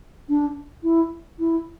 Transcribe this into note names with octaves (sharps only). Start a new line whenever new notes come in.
D4
E4
E4